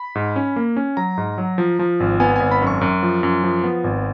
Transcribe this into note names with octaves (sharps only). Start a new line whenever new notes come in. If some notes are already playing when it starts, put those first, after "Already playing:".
Already playing: B5
G#2
C#4
A#3
C#4
F#3 A#5
G#2
F#3
F3
F3
G#1
B3 G#5
G#1 G#5
B5
F#2 C#6
F#2
F3
F#2
F3
B3
G#1